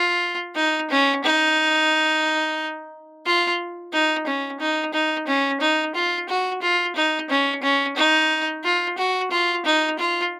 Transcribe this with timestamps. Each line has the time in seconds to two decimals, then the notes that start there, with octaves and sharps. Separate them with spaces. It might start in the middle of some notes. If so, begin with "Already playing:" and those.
Already playing: F4
0.56 D#4
0.90 C#4
1.24 D#4
3.26 F4
3.93 D#4
4.27 C#4
4.60 D#4
4.93 D#4
5.27 C#4
5.61 D#4
5.95 F4
6.29 F#4
6.62 F4
6.96 D#4
7.30 C#4
7.63 C#4
7.97 D#4
8.64 F4
8.98 F#4
9.31 F4
9.65 D#4
9.99 F4